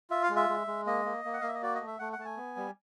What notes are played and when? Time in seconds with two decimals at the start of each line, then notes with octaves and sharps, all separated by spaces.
0.10 F4 E5
0.23 F5
0.30 G#3
0.36 E5
0.49 G#3
0.67 G#3
0.86 A#3 D#5
1.05 A#3
1.25 A#3
1.33 F#5
1.41 A#3 F5
1.48 E5
1.55 D#5
1.62 F#4 D5
1.75 D#5
1.80 A3
1.87 E5
1.99 A3 F#5
2.13 F#5
2.19 A3 A5
2.25 G#5
2.37 B3
2.57 G3